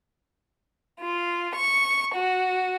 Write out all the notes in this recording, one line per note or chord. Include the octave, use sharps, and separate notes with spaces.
F4
C#6
F#4